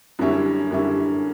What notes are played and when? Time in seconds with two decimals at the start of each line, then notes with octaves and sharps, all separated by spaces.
0.19 F#2 D3 G3 C#4 E4
0.71 F#2 D3 G3 C#4 E4